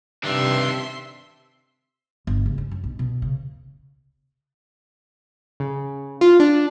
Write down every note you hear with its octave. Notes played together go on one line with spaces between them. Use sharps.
G2 C3 D#3 D4 E5 C6 B6
G1
C#2
C#4
F#2
B1
B2
C#3
C#3
F4
D4